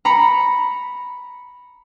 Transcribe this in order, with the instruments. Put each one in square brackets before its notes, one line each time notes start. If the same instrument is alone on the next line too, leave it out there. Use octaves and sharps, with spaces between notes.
[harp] A#5 B5 C#7